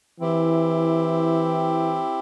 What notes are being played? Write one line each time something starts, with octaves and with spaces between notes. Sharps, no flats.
E3 C4 E4 G4